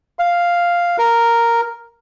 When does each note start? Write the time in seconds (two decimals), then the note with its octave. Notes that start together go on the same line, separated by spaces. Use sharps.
0.19 F5
0.98 A#4